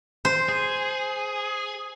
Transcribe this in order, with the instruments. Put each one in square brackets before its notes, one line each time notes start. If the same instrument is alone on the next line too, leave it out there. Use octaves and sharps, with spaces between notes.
[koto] C5
[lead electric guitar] G#4